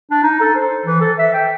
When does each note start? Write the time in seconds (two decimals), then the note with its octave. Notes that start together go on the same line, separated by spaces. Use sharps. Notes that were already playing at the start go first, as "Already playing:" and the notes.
0.11 D4
0.24 D#4
0.40 A4
0.56 C5
0.86 E3
1.01 A4
1.19 E5
1.33 G5